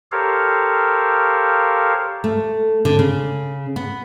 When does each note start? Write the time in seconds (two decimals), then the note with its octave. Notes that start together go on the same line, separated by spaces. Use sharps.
0.12 G4 A4 A#4 C5 C#5 F5
2.24 A3
2.85 D3
2.99 C#3
3.76 B3